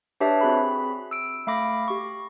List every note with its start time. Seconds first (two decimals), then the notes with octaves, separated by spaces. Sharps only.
0.20 D4 G4 B4 C#5 E5 A5
0.41 C4 F#4 G#4 B5
1.11 E6 D7
1.47 A3 F5 B5 D6 A#6
1.88 G4 C#6